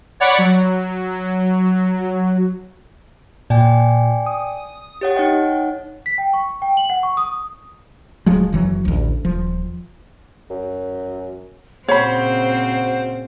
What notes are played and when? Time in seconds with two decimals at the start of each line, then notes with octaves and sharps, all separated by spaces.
0.20 C#5 D5 F#5 B5
0.38 F#3
3.50 A#2 D5 G5 G#5
4.26 D#6
5.01 G4 C#5 F#5
5.16 D#4 C#5 D#5 F#5 G5
6.06 B6
6.18 G5
6.33 C#6
6.62 G5
6.77 F#7
6.90 F#5
7.03 C#6
7.17 D#6
8.26 D1 F3 F#3 G#3
8.52 F#1 E3 F#3
8.85 A1 D2
9.24 D#1 F3
10.50 F#2
11.88 A#2 C#3 C4 F#4 C5 C#5 B5